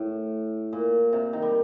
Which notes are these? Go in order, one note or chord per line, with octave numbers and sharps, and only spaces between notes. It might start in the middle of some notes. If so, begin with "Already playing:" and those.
Already playing: A2
A#2
C3
D#3
G3